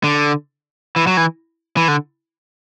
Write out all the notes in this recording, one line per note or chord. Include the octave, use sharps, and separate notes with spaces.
D3
E3
F#3
E3
E3
D3